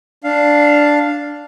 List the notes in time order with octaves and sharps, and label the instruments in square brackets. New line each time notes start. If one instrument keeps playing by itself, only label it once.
[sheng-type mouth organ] D4 F5